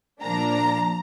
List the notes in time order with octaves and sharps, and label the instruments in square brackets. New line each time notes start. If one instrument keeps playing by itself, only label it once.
[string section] A#2 F3 A#3 D4 A#5